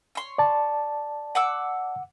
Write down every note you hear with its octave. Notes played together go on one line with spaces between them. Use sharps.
C#5 C6
D5 A5
F#5 D6 E6